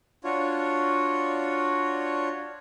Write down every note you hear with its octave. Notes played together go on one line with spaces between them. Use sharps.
D4 F4 F#4 C#5